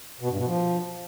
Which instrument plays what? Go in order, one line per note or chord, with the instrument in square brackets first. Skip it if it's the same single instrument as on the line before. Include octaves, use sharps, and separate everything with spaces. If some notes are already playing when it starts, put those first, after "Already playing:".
[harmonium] B2
G2
B2
F3